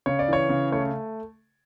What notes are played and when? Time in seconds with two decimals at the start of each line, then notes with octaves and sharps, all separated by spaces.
0.06 C#3 C#5
0.19 D5
0.28 E3 C#5
0.49 C#3
0.72 A3 C#5